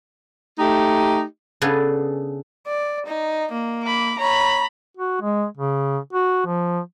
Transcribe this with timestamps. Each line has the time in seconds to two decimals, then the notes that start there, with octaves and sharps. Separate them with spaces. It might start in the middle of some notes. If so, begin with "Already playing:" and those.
0.59 A3 D#4 G4
1.62 C#3 B3 D4 G#4 A4
2.67 D5
3.06 D#4
3.52 A#3
3.83 B5 D6
4.19 C#5 A#5 B5
4.97 F#4
5.22 G#3
5.57 C#3
6.13 F#4
6.46 F3